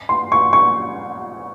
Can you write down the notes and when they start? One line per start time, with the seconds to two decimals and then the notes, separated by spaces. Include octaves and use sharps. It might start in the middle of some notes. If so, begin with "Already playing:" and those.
0.09 C6
0.32 C#6
0.53 C#6